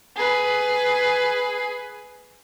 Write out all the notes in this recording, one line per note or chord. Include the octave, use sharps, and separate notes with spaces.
G#4 B4